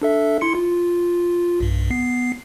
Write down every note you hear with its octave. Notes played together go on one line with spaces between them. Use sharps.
D4 A4 E5
E4 C6 C#7
F4
B1 G2
B3 C7